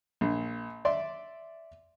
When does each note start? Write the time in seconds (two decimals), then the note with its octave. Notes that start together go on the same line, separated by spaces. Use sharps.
0.21 A#1
0.85 D5 E5 C6